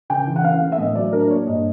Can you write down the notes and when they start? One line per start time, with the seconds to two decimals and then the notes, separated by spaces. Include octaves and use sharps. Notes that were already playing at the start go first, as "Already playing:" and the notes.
0.10 C#3 G5
0.27 E3
0.36 F#5
0.44 C#4 F5
0.61 A3
0.72 E5
0.78 A2 D#5
0.95 F#3 D5
1.13 D4 A#4
1.30 A#3 C#5
1.47 G2 D#5